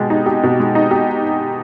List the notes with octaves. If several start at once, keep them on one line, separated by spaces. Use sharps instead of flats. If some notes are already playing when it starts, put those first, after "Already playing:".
Already playing: B2 G#3 G4
D#4
G4
B2
G#3
D#4
G4